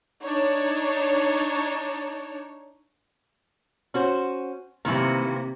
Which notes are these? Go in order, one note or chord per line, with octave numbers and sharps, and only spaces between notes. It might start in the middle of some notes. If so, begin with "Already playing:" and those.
D4 D#4 C#5
C#4 F#4 C5
C3 D#3 E3 A#3 E4